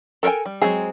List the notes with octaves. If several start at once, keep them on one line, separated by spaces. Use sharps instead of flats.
A4 A#4 C5 G5 G#5
G3
F#3 G#3 C4 G#4